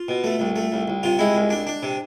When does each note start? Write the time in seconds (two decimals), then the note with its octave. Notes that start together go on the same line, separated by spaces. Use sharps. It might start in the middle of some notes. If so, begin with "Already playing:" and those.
Already playing: F4
0.09 B2
0.24 A3
0.39 C2
0.56 A3
0.72 C2
0.88 C2
1.03 C3 F4
1.19 G#3 E4
1.34 C2
1.50 D4
1.67 D4
1.83 C3